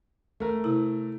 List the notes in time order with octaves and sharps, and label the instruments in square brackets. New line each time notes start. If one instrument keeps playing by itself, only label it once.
[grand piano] A3 A#4
[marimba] C3 E4